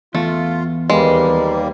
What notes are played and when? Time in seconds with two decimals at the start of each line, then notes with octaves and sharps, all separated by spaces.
0.15 E2 A3 F4
0.90 D#2 G3 G#3 A#3 B4